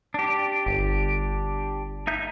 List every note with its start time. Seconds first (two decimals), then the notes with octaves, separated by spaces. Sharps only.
0.14 D4 G4
0.66 G1
2.07 D#4 E5 G6